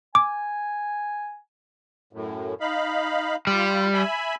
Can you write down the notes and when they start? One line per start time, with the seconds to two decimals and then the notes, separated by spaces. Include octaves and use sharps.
0.15 G#5 D6
2.13 F#2 A2
2.60 D#4 F5 B5
3.47 G3 F4 B5
3.94 E5 G#5 B5